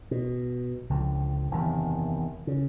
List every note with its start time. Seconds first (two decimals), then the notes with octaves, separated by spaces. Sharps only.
0.11 B2
0.90 C#2 D3 F3
1.51 F#1 E2 C3 D#3
2.47 C#3